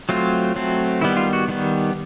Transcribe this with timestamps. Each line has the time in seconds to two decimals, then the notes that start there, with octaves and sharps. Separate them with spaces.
0.09 F#3 A3 C4 F4
0.56 F#3 A3 C4
1.01 D#3 G3 B3 E4
1.17 F4
1.33 F#4
1.48 D#3 G3 B3